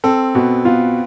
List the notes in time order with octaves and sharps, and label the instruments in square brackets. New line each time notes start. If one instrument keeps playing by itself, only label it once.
[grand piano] C4 [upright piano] A4
[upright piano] B2 [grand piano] B3
[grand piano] B3 [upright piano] F4